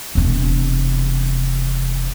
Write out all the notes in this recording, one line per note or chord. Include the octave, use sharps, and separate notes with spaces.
E1 C3